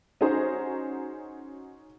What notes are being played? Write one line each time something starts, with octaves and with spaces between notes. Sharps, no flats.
C#4 D#4 F#4 G#4 C5 A#5